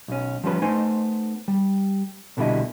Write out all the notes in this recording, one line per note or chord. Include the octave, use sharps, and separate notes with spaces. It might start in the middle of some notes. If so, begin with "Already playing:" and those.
B1 C#4
F3 G3 C#4 B4
A3 B3 D#4 C5 G#5
G3
C2 B2 D3 G3 E4 D#5